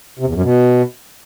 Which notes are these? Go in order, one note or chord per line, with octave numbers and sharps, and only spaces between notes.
C3
E2
F#2
B2